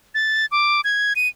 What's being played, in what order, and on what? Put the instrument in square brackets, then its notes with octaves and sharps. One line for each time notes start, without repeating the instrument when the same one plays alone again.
[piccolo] A6
D6
G#6
D#7